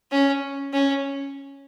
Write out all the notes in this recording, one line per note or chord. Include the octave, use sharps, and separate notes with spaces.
C#4
C#4